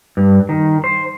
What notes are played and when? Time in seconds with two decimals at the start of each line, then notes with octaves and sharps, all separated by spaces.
0.17 G2
0.49 D#3
0.84 C5